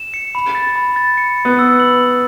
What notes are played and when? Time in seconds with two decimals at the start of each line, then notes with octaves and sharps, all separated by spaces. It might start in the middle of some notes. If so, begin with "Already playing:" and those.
Already playing: E7
0.14 C#7
0.35 B5
0.55 A6
0.76 B5
0.96 A6
1.17 C#7
1.38 C#7
1.45 B3
1.59 E6
1.80 F#7